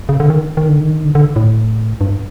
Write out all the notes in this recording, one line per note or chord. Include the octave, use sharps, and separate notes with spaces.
C#3
D3
D#3
D#3
D3
D#3
D3
D3
A2
G2